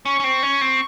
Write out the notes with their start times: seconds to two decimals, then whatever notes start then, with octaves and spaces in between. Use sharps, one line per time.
0.05 C#4 C#6
0.20 C#4
0.24 C4
0.43 C#4
0.61 C4